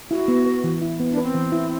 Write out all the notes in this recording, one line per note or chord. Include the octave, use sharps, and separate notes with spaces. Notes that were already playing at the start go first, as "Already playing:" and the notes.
E4 F#4
B3
B4
E3
E4
B3
D4
B4
C4
E3
E4